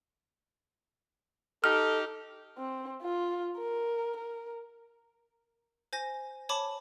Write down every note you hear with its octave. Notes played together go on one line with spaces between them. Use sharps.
D#4 G4 A4 F6
C4
F4
A#4
A#4
C5 G#5 A#6
C#5 A5 B5 D6